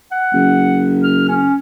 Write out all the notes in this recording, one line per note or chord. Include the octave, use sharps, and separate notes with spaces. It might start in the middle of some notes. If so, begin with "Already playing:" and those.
F#5
F#1
F6
C#4